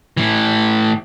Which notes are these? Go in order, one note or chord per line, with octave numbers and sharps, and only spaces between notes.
A2 E3